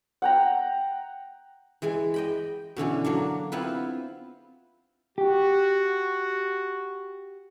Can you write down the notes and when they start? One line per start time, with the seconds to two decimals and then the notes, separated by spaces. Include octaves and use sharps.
0.22 F#5 G5 A#5
1.82 E3 G#3 G#4
2.14 D#5 G5 B5
2.77 B2 D3 E3 C#4
3.04 F#3 A#3 D4
3.52 B3 C4 E4 F4 B4
5.18 F#4 G4